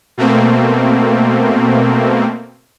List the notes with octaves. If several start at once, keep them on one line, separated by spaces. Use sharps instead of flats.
B2 A3 A#3 C4